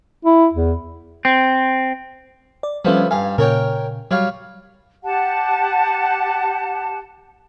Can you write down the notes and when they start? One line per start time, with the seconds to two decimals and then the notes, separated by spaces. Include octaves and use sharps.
0.25 E4
0.53 E2
1.25 C4
2.63 D5
2.85 D2 F3 G3 B3 C#4
3.11 G2 F5 G#5
3.38 A#2 C#3 A#4 C#5 G5
4.11 F#3 G3 C#5 F5
5.04 G4 F#5 A5